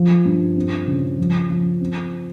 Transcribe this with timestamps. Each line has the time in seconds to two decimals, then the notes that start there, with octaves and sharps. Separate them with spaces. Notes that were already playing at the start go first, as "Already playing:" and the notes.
Already playing: F3
0.25 G2
0.56 C4
0.87 C#3
1.18 F3
1.50 F3
1.81 C4